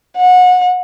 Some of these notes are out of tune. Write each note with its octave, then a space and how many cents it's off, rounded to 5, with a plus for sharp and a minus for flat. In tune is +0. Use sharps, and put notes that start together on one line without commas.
F#5 -25